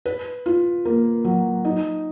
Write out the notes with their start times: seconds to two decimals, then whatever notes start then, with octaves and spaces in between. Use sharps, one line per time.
0.06 B4
0.46 F4
0.85 A#3
1.25 F#3
1.65 D#4